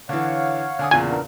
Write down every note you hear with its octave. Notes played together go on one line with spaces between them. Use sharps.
D3 E3 C#5 F5 F#5
D3 G#5 D#6
E2 A#2 C#3 G#5
B3 D4 A#4